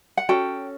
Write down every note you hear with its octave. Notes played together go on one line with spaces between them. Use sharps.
F#5
C#4 F#4 A4 G5